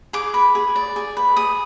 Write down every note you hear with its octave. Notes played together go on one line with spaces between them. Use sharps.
G#4 D6
B4
G#4
D5
G#4
B4
G#4 D#6